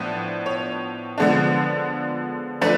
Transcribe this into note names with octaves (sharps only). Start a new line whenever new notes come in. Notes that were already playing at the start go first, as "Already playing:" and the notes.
Already playing: A2 F3 B3 D4
C#5
D3 F3 G#3 B3 D4
F3 A3 D4 B4